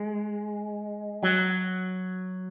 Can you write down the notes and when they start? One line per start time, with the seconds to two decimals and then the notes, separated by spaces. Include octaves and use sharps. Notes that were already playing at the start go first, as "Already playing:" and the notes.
Already playing: G#3
1.23 F#3